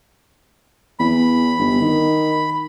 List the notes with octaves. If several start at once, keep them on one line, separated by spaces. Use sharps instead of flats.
E2 B5
G1
D#3